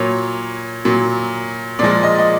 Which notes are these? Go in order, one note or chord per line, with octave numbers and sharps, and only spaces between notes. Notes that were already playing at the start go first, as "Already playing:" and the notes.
Already playing: A#2 F#3 C#5
A#2 F#3
A#2 F3 G#3 D5
D#5
D#5